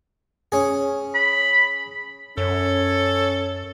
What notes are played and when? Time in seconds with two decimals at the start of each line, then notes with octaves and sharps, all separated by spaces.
0.52 C#4 G#4
1.15 B5
2.38 F#2 C#4 A4 C#5